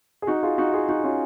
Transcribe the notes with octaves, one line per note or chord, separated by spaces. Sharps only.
G#4
D#4 F#4
F4 G#4
D#4 F#4
F4 G#4
D#4 F#4
C#4 F4